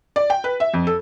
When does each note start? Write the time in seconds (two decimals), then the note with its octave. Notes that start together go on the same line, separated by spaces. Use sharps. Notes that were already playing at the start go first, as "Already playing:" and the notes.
0.16 D5
0.30 G5
0.44 B4
0.60 E5
0.74 F2
0.87 A4